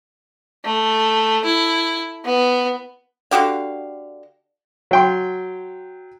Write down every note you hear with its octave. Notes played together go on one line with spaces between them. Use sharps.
A3
E4
B3
D3 F#4 G4 F5
F#3 G5 C6